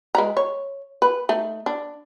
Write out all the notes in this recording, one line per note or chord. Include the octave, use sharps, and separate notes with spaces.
G#3 B4 A#5
C#5
B4
A3 D#4
D4